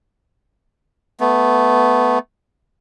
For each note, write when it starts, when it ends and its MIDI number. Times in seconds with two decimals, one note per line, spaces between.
1.20 2.19 57
1.20 2.19 59